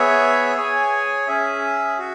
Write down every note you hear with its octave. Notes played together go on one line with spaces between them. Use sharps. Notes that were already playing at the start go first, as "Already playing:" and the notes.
Already playing: B3 G#4 C#5 E5
G#4 C#5 G#5
C#4 G#4 E5
F#4